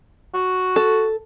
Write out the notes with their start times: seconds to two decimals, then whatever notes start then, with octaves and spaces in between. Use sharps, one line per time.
0.34 F#4
0.76 A4